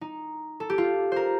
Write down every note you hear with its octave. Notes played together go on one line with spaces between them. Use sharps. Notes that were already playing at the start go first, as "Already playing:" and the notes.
D#4
A4
G4
F4
A#4 C5